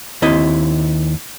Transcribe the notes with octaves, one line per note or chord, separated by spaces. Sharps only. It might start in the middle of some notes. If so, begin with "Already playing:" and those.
D#2 C4 E4 D#5